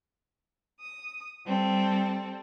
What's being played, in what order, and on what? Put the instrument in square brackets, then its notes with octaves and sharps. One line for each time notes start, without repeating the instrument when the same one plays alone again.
[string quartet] D#6
G3 C4 A4